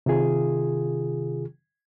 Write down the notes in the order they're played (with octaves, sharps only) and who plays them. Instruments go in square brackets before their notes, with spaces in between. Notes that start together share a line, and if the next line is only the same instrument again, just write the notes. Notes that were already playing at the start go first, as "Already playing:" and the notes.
[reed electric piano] C3 D#3 F4 G#4